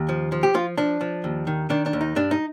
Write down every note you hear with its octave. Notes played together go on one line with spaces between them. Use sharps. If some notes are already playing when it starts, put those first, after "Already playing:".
Already playing: D#2
F3
F3
G4
F3 F4
F3 D4
F3
D#2
D#3
D#3 D4
D4
D#2
D#4
G2 D4
D#4